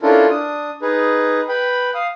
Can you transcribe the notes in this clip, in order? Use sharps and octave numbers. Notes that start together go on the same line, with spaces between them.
C#4 D4 E4 F4 A4 A#4
D4 D#6
D#4 G#4 B4
B4 G5 B5
F5 D#6